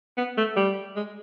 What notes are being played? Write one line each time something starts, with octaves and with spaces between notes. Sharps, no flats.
B3
A3
G3
G#3